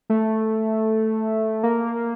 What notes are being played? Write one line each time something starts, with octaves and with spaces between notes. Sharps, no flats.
A3
A#3